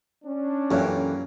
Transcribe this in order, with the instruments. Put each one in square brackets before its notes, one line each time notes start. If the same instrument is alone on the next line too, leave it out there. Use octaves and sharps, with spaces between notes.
[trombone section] C#4 D4
[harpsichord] F#2 A#2 [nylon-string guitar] E3 G4 A4